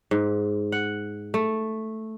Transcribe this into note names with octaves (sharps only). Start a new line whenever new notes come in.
G#2
F#5
A3